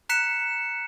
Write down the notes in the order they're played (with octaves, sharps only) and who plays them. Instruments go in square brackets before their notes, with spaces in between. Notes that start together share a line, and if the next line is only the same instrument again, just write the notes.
[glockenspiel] A#5 F#6 B6 C#7 E7